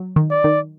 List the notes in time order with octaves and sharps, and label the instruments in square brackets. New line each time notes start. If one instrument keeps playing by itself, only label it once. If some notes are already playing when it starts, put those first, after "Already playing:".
Already playing: [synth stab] F#3
D#3
[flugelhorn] D5
[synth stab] D#3